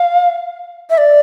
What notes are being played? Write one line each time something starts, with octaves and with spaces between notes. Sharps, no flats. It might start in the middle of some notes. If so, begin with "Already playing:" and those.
Already playing: F5
E5
D5